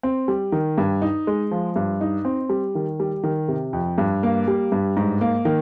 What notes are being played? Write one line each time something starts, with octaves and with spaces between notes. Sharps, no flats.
C4
G3
D#3
G2
D#4
G#3
F3
G2
D#4
C4
G3
D#3
G3
D#3
C3
F2
G2
A#3
G3
G2
G#2
A#3
D#3